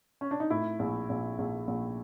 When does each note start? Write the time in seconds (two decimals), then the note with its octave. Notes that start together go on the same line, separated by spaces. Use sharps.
0.21 C#4
0.31 D4
0.40 D#4
0.50 A2 E4
0.79 A#1
1.09 A#1
1.38 A#1
1.67 A#1